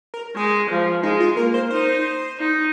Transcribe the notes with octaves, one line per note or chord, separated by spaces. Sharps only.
A#4
G#3 G#4
F3
G#3 D#4
F4
A#3 A#4
C5
D#4 C5
D#4